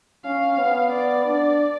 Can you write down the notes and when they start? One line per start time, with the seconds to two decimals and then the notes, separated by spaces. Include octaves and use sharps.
0.25 C#4 F5
0.59 B3
0.92 D5
1.25 D4